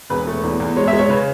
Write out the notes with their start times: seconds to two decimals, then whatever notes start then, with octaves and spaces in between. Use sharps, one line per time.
0.10 E1 B4
0.27 A3
0.43 E2
0.60 E2
0.77 G#3 C#5
0.88 E5
0.93 G#3
0.99 C#5
1.09 C#3 B4